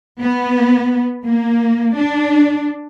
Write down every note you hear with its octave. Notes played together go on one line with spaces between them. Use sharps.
B3
A#3
D4